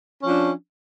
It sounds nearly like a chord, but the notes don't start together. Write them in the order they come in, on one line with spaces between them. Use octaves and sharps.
C#4 F3 D4